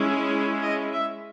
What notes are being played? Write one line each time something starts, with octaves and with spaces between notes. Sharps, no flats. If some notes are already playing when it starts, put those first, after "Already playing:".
Already playing: G#3 C#4 E4
D#5
E5